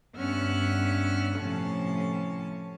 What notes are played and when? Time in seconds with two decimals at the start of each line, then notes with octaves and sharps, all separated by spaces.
0.16 G2 B3 C#4 E5 F6 F#6
1.37 A2 C3 F3 C#4 A5